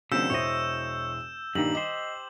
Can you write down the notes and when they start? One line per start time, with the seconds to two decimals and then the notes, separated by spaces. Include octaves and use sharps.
0.12 D#2 C#3 F#3 C4 D4 E6 G6 E7
0.30 E1 E4 C5 C#5 D#5
1.55 G2 A#2 D#3 G3 D#4 F#7
1.75 G4 C5 D#5